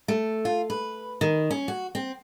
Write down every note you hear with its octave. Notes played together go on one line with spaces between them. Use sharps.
A3
F4
B4
D#3
C#4
F#4
C4